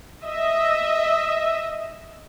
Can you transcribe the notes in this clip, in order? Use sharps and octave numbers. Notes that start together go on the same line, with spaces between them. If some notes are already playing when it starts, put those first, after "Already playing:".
D#5 E5